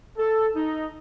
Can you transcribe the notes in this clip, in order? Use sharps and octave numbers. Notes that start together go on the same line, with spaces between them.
A4
D#4